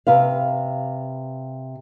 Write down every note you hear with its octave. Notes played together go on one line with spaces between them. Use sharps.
C3 B4 F5